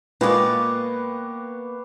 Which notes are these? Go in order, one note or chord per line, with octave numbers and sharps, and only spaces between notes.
A#2 G#3 A#3 B3 B4 C#5 D5 G5